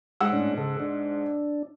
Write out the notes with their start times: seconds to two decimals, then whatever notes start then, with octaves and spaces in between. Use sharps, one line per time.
0.21 G#2 F#5 E6
0.32 A2 C#4 D4
0.58 C#3 A4
0.80 D4